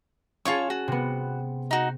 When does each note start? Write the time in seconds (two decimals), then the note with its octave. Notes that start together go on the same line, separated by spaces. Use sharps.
0.45 C#4 F4 G#4 C#5 A5 C#6
0.70 F#4
0.88 C3 B3
1.71 D#4 F#4